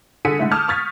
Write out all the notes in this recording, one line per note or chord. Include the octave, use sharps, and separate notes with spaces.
D3 G#4 A4 B6 C#7 D#7
D3 G#3 A3 E4
A5 D6 D#6 F6 G6 G#6
C#6 D#6 F6 G#6 A6 B6